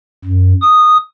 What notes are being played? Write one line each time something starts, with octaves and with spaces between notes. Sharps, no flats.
F#2
D#6